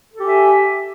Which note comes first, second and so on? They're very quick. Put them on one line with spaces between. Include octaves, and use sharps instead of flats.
A4 G4 G#5 E5